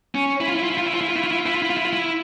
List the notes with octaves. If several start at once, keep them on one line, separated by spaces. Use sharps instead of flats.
C#4
E4
F4
E4
F4
E4
F4
E4
F4
E4
F4
E4
F4
E4
F4
E4
F4
E4
F4
E4
F4
E4